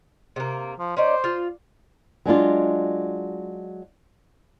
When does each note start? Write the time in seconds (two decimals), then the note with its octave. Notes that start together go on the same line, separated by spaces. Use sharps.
0.36 C3 A#3
0.79 F3
0.97 C#4 D#4 C5 D5
1.24 F4
2.25 F#3 G#3 D4 F4